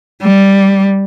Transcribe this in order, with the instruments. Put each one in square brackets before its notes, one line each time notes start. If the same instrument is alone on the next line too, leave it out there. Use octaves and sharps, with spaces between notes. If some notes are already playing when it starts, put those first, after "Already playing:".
[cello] G3